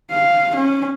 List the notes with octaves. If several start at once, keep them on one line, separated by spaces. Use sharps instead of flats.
F5
C#4